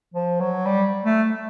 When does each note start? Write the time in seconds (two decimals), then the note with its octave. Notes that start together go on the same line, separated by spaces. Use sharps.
0.14 F3
0.40 F#3
0.66 G3
1.05 A3